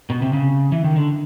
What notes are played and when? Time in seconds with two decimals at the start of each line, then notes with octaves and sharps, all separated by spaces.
0.10 B2
0.22 C3
0.33 C#3
0.72 E3
0.84 D#3
0.96 D3